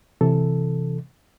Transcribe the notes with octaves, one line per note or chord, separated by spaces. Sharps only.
C3 E3 A4